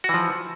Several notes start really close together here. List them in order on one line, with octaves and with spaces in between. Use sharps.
F#4 E3 F3